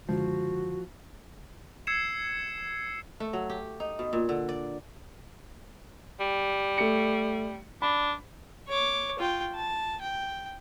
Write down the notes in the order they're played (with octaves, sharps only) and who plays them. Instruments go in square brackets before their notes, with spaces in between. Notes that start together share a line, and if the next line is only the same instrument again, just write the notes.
[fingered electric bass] F#1 D3 G#3 [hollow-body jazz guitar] F3 [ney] F#4
[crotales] E6 G#6 C7 C#7 E7
[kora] A3
F#3
G4
D#4
B2
A#2
D3
D5
[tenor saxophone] G3
[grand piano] A3 C#7
[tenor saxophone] D4 [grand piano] B5
[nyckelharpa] C#5 D6
F4 G5
A5
G5